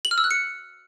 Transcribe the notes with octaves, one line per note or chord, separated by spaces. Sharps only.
F#7
F6
E6
F#6
C#7